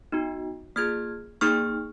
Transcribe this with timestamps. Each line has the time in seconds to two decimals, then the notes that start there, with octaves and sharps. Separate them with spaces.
0.12 B3 D#4 F#4
0.76 A#3 F4 G#4 F6 G#6
1.41 A#3 D#4 G#4 C#6 F6